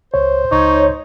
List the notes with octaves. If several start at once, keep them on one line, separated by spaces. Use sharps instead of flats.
C#2 C5 C#5
C#2 D#4 C#5